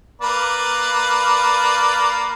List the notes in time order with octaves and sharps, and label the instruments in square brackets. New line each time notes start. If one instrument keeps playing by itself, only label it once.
[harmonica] A#3 B4 D5